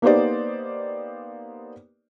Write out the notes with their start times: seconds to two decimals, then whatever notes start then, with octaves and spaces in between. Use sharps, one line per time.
0.02 A#3 B3 D#4 G4 C5 D5